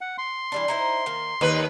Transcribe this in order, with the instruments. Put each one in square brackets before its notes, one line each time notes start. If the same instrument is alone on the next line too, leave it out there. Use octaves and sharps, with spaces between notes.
[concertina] F#5
C6
[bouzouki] E3 G3 D4
D#4 E4 C5
D#3 A#3
[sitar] D#2 B4 [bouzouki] D#4 A#4